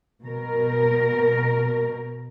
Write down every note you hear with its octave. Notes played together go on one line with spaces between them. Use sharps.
B2 A#4